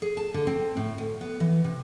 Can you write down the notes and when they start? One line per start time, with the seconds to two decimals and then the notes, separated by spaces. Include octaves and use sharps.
0.02 G#4
0.17 A5
0.34 D3
0.47 C4
0.77 A2
0.98 D2
1.21 B3
1.40 E3
1.64 C3